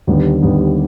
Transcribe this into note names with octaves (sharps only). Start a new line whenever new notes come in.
D#2 D3 G3 B3
D#2 D3 G3 B3